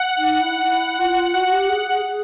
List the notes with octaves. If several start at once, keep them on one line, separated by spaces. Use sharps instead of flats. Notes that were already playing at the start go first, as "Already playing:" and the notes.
Already playing: F#5
D#4
E4
E4
F4
F#4 F#5
F#4
G4
G#4
G#4
G#4